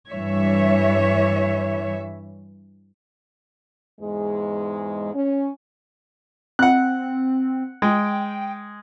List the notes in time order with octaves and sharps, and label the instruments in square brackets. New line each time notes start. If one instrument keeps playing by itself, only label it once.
[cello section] G2 E3 C#5 E5
[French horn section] E2 G#2 G#3
C#4
[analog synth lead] C4 [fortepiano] F#5 F#6
[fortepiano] G#3 [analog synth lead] G5